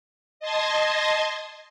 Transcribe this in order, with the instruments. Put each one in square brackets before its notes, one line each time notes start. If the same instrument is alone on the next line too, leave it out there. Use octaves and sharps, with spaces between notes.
[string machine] D#5 A5 C6 G#6 A#6